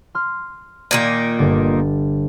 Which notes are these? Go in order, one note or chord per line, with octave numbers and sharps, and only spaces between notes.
C6 F6
A#2 D#3 A#3
G1 D6 A6